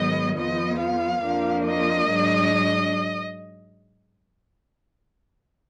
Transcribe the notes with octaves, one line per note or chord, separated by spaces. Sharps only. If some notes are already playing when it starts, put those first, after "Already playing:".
Already playing: G#2 D#3 F#3 B3 D#5
F2 F3 B3 D#5
F5
F2 F3 A#3 D4
D#5
G#2 F#3 D4